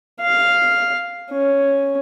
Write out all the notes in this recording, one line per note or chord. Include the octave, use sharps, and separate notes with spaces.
F5
C#4